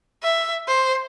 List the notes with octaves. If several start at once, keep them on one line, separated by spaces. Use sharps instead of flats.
E5
C5